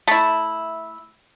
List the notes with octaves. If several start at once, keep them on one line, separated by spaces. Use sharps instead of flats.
A3 E4